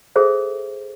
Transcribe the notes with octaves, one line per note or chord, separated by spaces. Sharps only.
G#4 A4 C5 E5